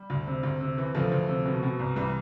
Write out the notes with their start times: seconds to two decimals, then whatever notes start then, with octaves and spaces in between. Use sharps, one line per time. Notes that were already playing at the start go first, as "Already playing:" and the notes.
Already playing: G3
0.10 D2
0.27 C3
0.43 D2
0.60 C3
0.78 E3
0.95 D2 F3 A3
1.12 D2
1.29 C3
1.45 B2
1.63 B2
1.79 C2
1.96 C2 E3 G3